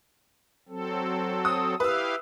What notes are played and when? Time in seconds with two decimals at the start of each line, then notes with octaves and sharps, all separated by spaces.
0.69 F#3 C4 A4
1.45 D#6
1.80 E4 G4 B4 F5 E6